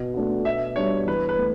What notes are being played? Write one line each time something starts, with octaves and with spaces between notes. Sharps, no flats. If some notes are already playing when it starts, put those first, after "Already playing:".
Already playing: B2
A3 D4 F#4
B2 E5
G3 D4 F#4 C#5
E2 B4
B4
A3